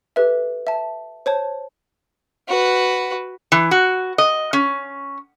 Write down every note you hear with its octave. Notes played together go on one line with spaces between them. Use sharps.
G4 A4 B4 E5
E5 A5
C5 C#5 A5
F#4 B4
E3
F#4
D#5
C#4